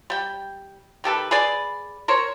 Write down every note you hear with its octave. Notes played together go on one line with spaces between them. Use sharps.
G3 G5
D#3 G4 A4 B4
G#4 B4 D5
A#4 C5 C#5